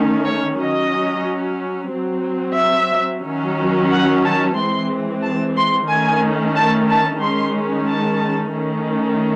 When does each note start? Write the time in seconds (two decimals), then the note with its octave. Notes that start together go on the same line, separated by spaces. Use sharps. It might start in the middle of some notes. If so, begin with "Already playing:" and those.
Already playing: D#3 A3 C#4
0.26 C#5
0.60 F#3 C#4 D#5
1.92 F#3 C4
2.58 E5
3.25 D#3 F#3 C#4
3.91 F#5
4.24 A5
4.57 E3 G#3 C4 C6
5.24 A5
5.57 C6
5.89 D#3 A3 C#4 G#5
6.56 A5
6.89 A5
7.22 D#3 G#3 C#4 C6
7.88 A5
8.55 D#3 A3 C#4